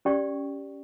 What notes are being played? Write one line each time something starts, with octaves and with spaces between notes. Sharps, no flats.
C#4 G4 D5 G5 C#6